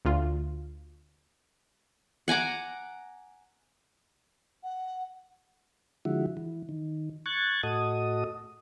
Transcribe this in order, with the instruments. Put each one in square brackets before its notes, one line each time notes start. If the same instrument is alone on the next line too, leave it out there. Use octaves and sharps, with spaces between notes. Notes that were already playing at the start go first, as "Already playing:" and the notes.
[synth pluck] D2 F4
[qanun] F#5 G#5 A#5 D6
[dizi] F#5
[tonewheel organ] D3 F3 G#3 E4 F#4
E3
D#3
C#6 F#6 G#6 A6
A2 F#4 A4 D#5 D#6